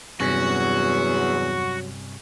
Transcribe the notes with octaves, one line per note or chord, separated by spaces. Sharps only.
E2 G2 C3 F#3 C#4 F#4